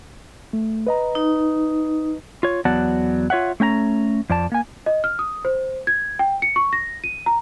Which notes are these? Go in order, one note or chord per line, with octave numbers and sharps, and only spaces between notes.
A3
B4 D#5 A#5
D#4
F4 C#5
E2 F#3 B3 D5 F#5 A5
F4 C#5 E5 F#5
A3 C#4 G5 A#5
F2 D5 A5
A#3 G#5
D#5
F6
D#6
C5
G#6
G5
C#7
C#6
A#6
D#7
A#5